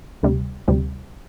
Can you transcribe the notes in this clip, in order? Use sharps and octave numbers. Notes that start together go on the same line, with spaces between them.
D2 C3 G3
D2 C3 G3